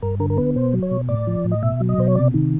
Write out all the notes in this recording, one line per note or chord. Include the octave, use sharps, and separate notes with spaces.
G2 A#4
D3 A#4
A#4
B3 B4
B2 C5
F#3
C#5
B2
A2 D5
F3
A2
D#5
B2 E5
F#3
D#5
B2 C5
C#5
C3 D5
D#3